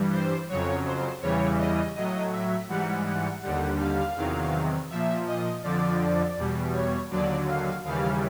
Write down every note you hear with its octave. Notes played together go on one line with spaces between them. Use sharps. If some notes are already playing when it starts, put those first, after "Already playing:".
Already playing: G2 E3 G3
C5
F2 C#3 F#3 C#5
C5
E2 C#3 E3 G3 C#5
D#5
A2 F#3 D#5
E5
G#2 E3 G3 F#5
F#5
D#2 D3 G3 F#5
F5
E2 C3 D#3 F#3
A#2 F3 E5
D#5
F2 D3 F3 D5
E2 B2 G3
C#5
D#2 D3 F#3 D5
F5
D#2 C#3 E3 G3 F5